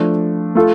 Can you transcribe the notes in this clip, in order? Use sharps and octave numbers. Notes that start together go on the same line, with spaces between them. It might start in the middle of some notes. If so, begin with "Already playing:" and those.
Already playing: F3 A3 D4
A3 F4 A4